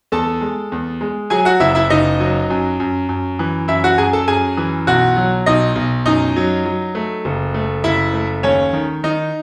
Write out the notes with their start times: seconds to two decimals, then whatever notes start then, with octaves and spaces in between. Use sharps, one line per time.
0.12 E2 A4 A5
0.41 G#3
0.72 E2
1.01 G#3
1.30 F#3 G#4 G#5
1.45 F#4 F#5
1.60 F#1 E4 E5
1.75 E4 E5
1.90 F#1 D#4 D#5
2.20 F#3
2.50 F#2
2.80 F#2
3.09 F#2
3.39 E3
3.68 F#2 E4 E5
3.84 F#4 F#5
3.98 F#2 G#4 G#5
4.13 A4 A5
4.28 F#2 G#4 G#5
4.57 E3
4.87 B1 F#4 F#5
5.17 F#3
5.46 B1 D#4 D#5
5.76 B1
6.06 F#2 D#4 D#5
6.36 F#3
6.66 F#3
6.95 A3
7.25 F#1
7.54 A3
7.84 F#1 E4 E5
8.14 A3
8.43 D#2 C#4 C#5
8.73 D#3
9.03 D#3 D#4